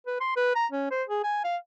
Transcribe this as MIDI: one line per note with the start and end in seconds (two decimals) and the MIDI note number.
0.07 0.17 71
0.21 0.32 84
0.36 0.53 71
0.56 0.66 82
0.72 0.86 61
0.91 1.03 72
1.09 1.22 68
1.24 1.43 80
1.44 1.57 77